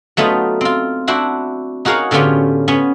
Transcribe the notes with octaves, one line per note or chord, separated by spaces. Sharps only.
F#3 A3 B3 D#4 F4
C4 F4
D4 E4 F#4 C5
D#4 F#4 G#4 A#4 C#5 F5
A2 D3 B3 C#4 F4 G4
B3 C#4